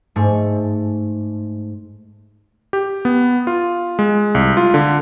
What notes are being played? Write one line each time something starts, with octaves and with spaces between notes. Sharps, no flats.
G#2 A3
G4
B3
F4
G#3
C2
F4
D3